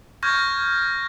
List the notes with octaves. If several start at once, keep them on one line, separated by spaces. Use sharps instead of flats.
C#6 F6 G6 G#6 A#6